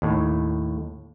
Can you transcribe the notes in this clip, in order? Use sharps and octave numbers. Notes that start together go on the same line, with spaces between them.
D#2 A2